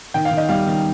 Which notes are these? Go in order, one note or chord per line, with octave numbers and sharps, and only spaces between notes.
D#3 G5
F5
D#3
D#5
G3 F5
D#3